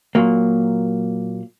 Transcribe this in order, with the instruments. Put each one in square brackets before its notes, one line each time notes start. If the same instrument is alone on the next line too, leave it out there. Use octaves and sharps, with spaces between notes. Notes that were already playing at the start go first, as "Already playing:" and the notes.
[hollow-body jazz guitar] A#2 F#3 A#3